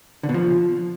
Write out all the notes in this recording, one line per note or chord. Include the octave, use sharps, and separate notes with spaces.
D3
B2
F3